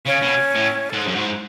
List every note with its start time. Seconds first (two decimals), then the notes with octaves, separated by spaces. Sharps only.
0.06 C#3 C#4
0.22 B2
0.55 A2
0.90 G#2 A4
1.02 F#2 G#4
1.13 G#2 F#4
1.25 E4